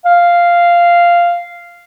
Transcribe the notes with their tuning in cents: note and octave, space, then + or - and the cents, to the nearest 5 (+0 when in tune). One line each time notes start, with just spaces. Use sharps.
F5 -5